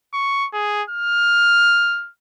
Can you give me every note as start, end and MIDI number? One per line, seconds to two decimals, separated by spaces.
0.14 0.47 85
0.53 0.83 68
0.90 2.10 89